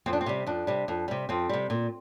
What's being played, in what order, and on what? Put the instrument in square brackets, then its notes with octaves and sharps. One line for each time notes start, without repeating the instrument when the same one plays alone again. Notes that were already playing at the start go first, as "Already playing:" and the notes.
[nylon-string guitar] F2 C4
D4
C4
C3 G3
F2 D4
C3 G3
F2
C3 G3
F2 C4
C3 G3
A#2